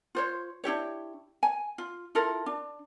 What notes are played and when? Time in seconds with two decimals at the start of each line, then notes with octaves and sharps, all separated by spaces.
0.15 F4 C5 C#5
0.64 D4 E4 G4 C#5
1.43 G#5
1.78 F4
2.15 E4 F4 A4 A#4
2.46 D4